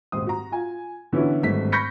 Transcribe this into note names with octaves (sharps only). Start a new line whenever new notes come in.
D#1 G#1 C5 D#6
F#4 A#5
F4 G#5
D3 E3 B3 C#4 E4 F#4
G#1 G2 A3 B6
B5 C#6 G6 A#6 B6 C#7